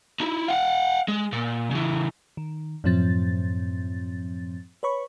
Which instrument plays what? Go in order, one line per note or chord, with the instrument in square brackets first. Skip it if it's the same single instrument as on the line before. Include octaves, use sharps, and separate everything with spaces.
[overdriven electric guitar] D#4 E4
F5 F#5
G#3
A#2
C#3 E3
[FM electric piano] D#3
F#2 A2 F3 C4 A6
B4 C#5 B5 C#6